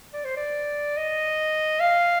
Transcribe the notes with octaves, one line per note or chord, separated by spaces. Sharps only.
D5
C5
D5
D#5
F5